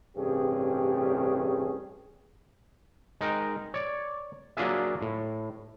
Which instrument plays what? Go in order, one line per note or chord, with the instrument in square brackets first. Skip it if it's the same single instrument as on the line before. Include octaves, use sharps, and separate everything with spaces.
[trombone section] A1 G2 C3 C#4 G4 G#4
[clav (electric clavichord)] G#3 D#4 A#4 G5
C#5 D5
F#3 A#3 D4 F4 G#4 E5
A2